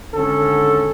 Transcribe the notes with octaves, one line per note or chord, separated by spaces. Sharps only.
G#1 D3 C#4 A4